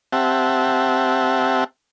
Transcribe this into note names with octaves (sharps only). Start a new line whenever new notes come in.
C4 G4 E5 F#5 A5